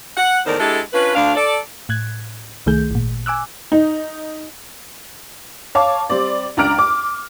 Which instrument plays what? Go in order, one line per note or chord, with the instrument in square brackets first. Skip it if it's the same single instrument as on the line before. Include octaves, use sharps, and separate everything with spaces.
[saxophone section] F#5
E2 A2 D#3 A#4 C5 D5
G#3 D4 E4 G4 A4
C#4 D4 F4 B4
D2 D4 F5
A4 D5
[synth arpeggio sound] A2 F#6 G#6
C2 D#3 A3 G#4 G6
G#1 A#2
G#5 D6 E6 F#6
[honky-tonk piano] D#4
C#5 F5 A5 D6
G3 C4 D5
C#2 D4 D5 A#5 F6 D7
D6